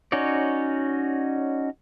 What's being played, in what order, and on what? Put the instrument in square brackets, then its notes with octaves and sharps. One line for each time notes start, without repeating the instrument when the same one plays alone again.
[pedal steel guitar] C#4 D#4 F#4 C#5 D5